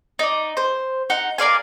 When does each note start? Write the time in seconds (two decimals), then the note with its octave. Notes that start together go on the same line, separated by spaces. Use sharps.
0.19 D#4 D5
0.57 C5
1.10 D#4 F#5
1.38 A#4 D5 F5 G#5